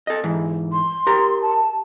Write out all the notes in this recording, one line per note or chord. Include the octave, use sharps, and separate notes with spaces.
A4 D#5
G#2 E3
C6
G4 A#4 A#5
A5